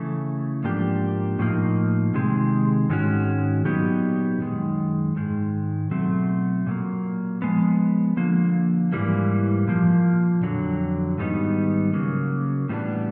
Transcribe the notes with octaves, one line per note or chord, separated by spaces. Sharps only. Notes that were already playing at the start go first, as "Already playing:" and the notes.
Already playing: C#3 E3 A3
G#2 F3 A#3 D4 G4
A2 F3 A#3 D#4
C3 D#3 G#3 C4
G#2 D#3 G#3 C#4 F#4
A#2 F#3 B3 D#4 G4
F#2 D#3 G#3
G#2 D#3 G#3
B2 F#3 A3 C4
A#2 F#3 A#3
F3 G#3 B3
D3 F3 A#3
G#2 E3 G3 A#3
A#2 F3 A#3
F2 D3 F#3
G#2 D#3 G3 B3 D#4
C#3 F#3 A#3
A2 E3 G3 B3 D4